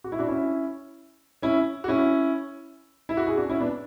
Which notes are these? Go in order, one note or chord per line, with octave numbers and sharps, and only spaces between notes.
F#4
E4
D4 F#4
C#4 E4
C#4 E4
F#4
C#4 E4
E4
F#4
E4 G#4
D4 F#4
C#4 E4
B3 D4